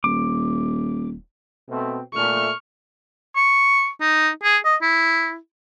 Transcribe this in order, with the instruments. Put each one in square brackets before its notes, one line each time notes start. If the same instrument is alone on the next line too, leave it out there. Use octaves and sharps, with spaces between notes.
[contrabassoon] D#1 [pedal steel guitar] D6
[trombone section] B2 A3 C4
[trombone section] A#2 A3 [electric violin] C#6 F6
[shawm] C#6
D#4
G#4
D#5
E4